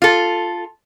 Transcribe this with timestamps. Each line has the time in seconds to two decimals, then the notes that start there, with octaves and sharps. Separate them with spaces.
0.02 F4 A4